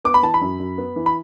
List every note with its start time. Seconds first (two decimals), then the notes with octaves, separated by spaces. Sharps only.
0.05 B3 D6
0.14 B5
0.23 E3 A5
0.34 B5
0.41 F#2
0.60 F#2
0.78 B3
0.96 E3
1.06 B5